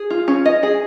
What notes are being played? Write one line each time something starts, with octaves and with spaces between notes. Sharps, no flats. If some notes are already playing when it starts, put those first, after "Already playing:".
Already playing: G#4
F4
C#4
D#5
G#4